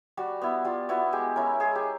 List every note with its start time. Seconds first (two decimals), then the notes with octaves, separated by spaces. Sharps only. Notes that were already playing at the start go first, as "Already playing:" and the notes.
0.17 G3 F#4
0.41 B3 E4
0.64 G3 F4
0.89 B3 E4 F#4
1.12 G#3 G4
1.36 C#4 E4 A#4
1.60 G#3 G#4
1.75 G4